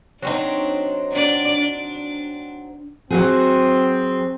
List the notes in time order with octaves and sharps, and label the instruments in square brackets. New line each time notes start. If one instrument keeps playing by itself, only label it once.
[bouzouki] F#3 C4 D#4 [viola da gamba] D4
[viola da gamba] D4 D5
D4
[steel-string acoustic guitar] F#3 F#4 G#4 [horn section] C4